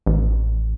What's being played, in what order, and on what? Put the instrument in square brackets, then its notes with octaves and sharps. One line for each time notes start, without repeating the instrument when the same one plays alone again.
[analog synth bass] A1